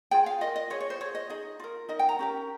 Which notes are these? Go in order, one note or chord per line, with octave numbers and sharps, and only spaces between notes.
F4 G#4 G5
F5
F4 A#4 D#5
D#5
F4 G#4 C#5
C#5
C5
F4 G#4 C#5
D#5
D#4 G#4 D#5
F4 A#4
D#4 A#4 D#5
G5
A#5
C#4 G4 A#4